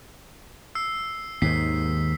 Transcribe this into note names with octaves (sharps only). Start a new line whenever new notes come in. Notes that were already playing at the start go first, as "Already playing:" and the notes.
E6 C7
D#2 G#2 D#3 B6 C7